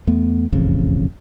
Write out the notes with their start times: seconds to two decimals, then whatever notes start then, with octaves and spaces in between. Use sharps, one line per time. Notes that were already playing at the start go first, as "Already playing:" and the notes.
0.07 E2 A3 B3
0.53 E1 A1 F2 C#3